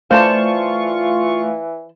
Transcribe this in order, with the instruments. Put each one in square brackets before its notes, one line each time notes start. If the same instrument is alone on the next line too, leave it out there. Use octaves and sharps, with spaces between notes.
[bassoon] E3 [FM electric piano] A3 F5 [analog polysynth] F4 C#6 [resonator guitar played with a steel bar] C5 D5 A5